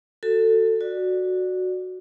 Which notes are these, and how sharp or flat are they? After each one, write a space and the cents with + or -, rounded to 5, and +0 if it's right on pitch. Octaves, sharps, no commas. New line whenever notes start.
F#4 +0 A4 +20
F#4 -5 D5 +15